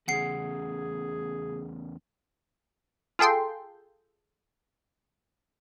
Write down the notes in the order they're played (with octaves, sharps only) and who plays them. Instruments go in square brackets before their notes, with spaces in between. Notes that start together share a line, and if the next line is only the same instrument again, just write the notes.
[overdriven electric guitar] E2 C#3 [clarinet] G#4 [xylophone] F#5 C7
[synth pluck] F4 G#4 A4 G5 C6